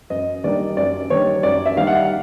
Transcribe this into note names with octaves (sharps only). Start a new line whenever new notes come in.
F#2 D#5
D#3 G3 A#3 D4 D5
F#2 D5
D#3 G3 A#3 D4 C#5
F#2 D5
E5
D#3 G3 A#3 D4 F5
F#5